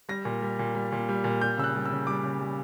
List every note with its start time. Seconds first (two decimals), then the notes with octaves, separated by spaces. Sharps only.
0.09 G3 A#6
0.25 A#2
0.42 G3
0.59 A#2
0.75 G3
0.92 A#2
1.09 G3
1.24 A#2
1.41 G3 G6
1.57 C#3 E6
1.64 F#6
1.75 G3
1.86 E6
1.91 C#3
2.07 G3 D6
2.23 C#3
2.40 G3